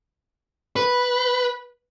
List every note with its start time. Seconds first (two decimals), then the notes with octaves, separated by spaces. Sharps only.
0.76 B4